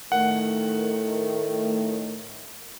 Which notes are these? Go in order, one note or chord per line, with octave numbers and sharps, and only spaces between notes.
A2 D#3 A3 F#5